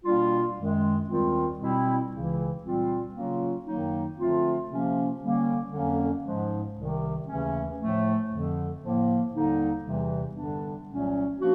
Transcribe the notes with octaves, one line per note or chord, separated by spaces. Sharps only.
B2 G3 A#3 D4 F4
F#2 D#3 G#3
D#2 D#3 G3 C4 F4
B2 G3 C4 E4
C#2 C#3 E3
A#2 G3 C4 F4
C#3 F#3 A#3 C#4 F4
F#2 D#3 F#3 A#3 D#4
D3 F3 A3 C4 F4
C3 F3 A#3 C#4
D3 G3 A#3 C#4
F2 D3 F#3 A#3 C#4
G#2 F3 G#3
C2 C3 D#3
D#2 C#3 E3 A3 C#4
A2 F3 A3
F2 D3 F3
A2 F3 A#3
D#2 D3 G3 A#3 D#4
E2 C3 E3 G3
G2 D3 G3 B3 D4
C2 A#2 F#3 A3 C#4
F3 A#3 D4 F#4